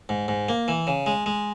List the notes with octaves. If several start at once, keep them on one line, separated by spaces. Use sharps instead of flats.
G#2
G#2
A#3
E3
C#3
G#3
G#3